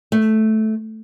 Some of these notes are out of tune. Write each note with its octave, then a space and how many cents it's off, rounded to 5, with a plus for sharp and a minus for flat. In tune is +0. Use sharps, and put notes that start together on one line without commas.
A3 -10